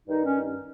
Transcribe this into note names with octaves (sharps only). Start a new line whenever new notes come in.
G2 D#3 D#4
C#4